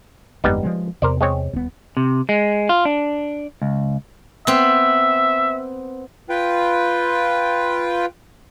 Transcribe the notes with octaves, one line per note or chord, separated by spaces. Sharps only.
G1 F2 G3 G#3 B3 D#4
F3 F#3 G#3
E2 C3 A#4 C5 D5
G#3 C4 C#5
D#1 B3
C3
G#3
F4
D4
C#2
B3 C4 E5
F4 B4 G5